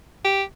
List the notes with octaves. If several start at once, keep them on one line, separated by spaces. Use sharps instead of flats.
G4